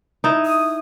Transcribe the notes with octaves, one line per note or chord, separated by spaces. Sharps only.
D#4 E4
D#6